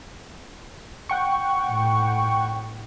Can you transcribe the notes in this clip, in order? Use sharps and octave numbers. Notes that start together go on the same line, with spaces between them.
F#5 G5 C#6
A2